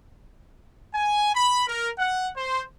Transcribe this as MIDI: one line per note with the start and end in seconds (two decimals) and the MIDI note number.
0.94 1.35 80
1.35 1.64 83
1.67 1.90 70
1.99 2.29 78
2.36 2.63 72